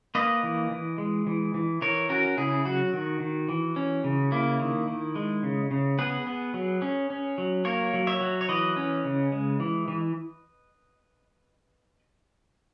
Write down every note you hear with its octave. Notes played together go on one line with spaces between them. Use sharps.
A#3 B4 D#5
E3
E3
G#3
E3
E3
E3 A#4 C#5
C#4 F#4 A#4
C#3 E4 G#4
F#3 F#4
D#3
D#3
E3
C#4
C#3
A#3 E4
D#3
D#3
G#3
C#3
C#3
B3 G#4 B4
B3
F#3
C#4
C#4
F#3
A#3 A#4 C#5
F#3
C#5 E5
F#3
C#5
E3 B4 D#5
C#4
C#3
G#3
E3
E3